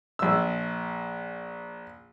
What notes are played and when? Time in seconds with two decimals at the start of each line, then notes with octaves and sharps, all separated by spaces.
0.19 A#1 E6